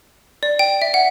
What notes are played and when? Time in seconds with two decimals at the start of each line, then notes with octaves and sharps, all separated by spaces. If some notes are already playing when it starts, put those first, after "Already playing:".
0.43 D5
0.59 G5
0.82 E5
0.94 F#5